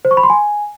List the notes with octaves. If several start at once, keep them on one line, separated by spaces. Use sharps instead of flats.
C5
C#6
B5
C6
G#5